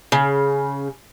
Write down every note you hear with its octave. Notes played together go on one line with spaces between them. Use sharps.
C#3